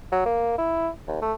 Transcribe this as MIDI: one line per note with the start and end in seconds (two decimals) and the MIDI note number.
0.12 0.25 54
0.26 0.56 58
0.58 0.89 64
1.08 1.21 39
1.22 1.33 57